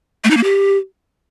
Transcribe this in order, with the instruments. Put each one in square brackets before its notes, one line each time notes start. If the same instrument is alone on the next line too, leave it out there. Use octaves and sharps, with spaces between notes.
[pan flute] A3
D#4
A#3
G4